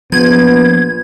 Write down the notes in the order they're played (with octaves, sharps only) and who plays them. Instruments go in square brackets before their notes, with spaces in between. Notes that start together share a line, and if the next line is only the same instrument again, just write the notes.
[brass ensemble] A#1 B3 [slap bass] F3 [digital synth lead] G#6